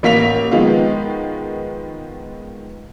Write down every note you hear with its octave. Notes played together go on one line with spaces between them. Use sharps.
A1 A#3 B6 F7
D#3 F3 G#3 B3 F4